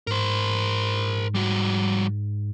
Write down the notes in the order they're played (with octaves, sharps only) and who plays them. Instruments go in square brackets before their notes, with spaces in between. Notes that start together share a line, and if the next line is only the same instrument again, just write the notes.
[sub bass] G#2 [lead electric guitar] A#4 C5
[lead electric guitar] G3 F#4